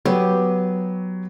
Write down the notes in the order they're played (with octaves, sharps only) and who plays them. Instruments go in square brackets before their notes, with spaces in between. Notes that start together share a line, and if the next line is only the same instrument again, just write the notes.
[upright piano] F#3 [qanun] B3 G4